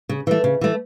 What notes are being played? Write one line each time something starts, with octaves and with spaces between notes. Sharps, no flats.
C#3
E3 A3
C#3
E3 A3